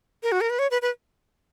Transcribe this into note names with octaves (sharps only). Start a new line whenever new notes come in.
A#4
F#4
A#4
B4
C#5
B4
B4